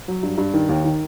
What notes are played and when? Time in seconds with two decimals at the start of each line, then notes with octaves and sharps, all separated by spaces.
0.08 F#3
0.23 G2
0.38 G2
0.54 D#3
0.69 D#2
0.84 D#3